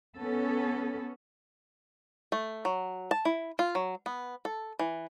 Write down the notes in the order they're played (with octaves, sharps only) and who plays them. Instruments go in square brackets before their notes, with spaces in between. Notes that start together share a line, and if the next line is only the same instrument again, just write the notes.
[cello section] B3 C#4 A4
[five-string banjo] A3
F#3
A5
E4
F4
F#3
B3
A4
E3